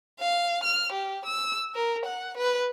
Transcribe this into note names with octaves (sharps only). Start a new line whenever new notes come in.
F5
F6
G4
E6
A#4
F#5
B4